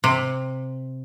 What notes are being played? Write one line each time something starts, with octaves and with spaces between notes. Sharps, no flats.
C3